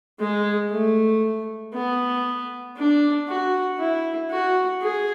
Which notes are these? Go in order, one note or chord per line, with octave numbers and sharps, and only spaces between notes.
G#3
A3
B3
D4
F#4
E4
F#4
G#4